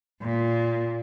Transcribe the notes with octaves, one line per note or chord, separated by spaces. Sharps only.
A#2